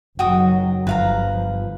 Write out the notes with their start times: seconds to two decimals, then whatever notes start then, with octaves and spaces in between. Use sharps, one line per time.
0.19 F#1 D#3 F#3 F#4 G5 D#6
0.87 G1 F3 B4 F5 A#5